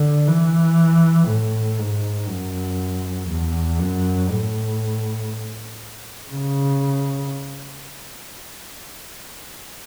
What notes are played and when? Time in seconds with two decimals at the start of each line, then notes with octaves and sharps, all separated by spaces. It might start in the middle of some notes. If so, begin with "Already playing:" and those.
Already playing: D3
0.27 E3
1.28 A2
1.78 G#2
2.28 F#2
3.29 E2
3.79 F#2
4.30 A2
6.30 C#3